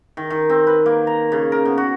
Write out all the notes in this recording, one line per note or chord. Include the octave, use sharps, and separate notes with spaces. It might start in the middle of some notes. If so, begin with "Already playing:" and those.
D#3
D#3
C4
B4
A#3
A#5
C#3
A#4
B2
F#4